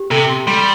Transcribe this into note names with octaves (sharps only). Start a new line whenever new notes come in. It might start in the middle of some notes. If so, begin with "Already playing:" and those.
Already playing: G4
C3 A4
C6
G3 C6